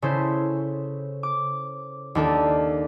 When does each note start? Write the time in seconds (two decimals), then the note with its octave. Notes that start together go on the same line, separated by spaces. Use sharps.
0.02 C#3 C#4 E4 A4 C5
1.23 D6
2.15 D#2 D4 A4